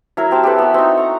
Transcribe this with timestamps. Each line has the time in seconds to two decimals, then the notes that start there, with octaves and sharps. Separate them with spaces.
0.17 F#3 E4 A#4
0.31 C4 G4 A5
0.43 G4 A4 B4
0.58 B3 F#4
0.74 C4 D#4
0.97 A#5 C#6